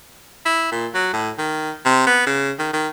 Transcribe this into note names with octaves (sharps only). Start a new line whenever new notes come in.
E4
A#2
F#3
A2
D#3
C3
B3
C#3
D#3
D#3